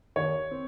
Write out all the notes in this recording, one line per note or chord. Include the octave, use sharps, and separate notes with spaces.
D#2 C#5
C4